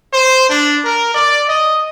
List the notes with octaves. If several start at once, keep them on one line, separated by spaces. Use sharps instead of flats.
C5
D4
A#4
D5
D#5